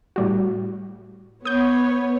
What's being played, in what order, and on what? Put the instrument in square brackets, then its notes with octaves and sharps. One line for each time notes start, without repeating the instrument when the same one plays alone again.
[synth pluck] A2 G3 F#4
[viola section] B3 C#5 [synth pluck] D#6 G6